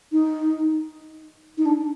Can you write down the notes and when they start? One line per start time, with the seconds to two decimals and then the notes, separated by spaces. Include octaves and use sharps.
0.12 D#4
1.58 D#4
1.66 D4